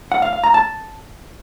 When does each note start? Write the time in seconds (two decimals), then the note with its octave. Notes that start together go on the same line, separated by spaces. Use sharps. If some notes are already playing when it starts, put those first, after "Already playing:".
0.12 F#5
0.22 F5
0.33 F5
0.44 A#5
0.54 A5